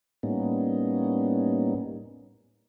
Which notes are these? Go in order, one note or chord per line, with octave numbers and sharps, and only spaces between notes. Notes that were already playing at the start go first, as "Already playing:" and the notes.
A2 G3 A#3 B3 C#4 D#4